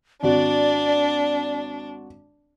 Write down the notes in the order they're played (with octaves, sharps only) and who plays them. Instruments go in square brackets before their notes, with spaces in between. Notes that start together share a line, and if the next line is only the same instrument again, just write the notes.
[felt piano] G#1 F#4 [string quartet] D4 [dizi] D5